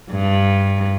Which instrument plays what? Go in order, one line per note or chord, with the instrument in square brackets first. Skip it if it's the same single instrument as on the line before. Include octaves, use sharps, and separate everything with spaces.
[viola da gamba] G2